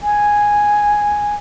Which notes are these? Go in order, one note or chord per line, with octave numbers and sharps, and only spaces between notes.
G#5